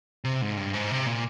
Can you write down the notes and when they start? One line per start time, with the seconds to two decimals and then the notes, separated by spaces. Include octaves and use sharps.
0.24 C3
0.42 G#2
0.57 G2
0.74 G#2
0.91 C3
1.06 A#2